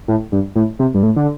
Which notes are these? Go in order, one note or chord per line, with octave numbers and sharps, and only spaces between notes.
A2
G2
A2
C3
G2
A2
D3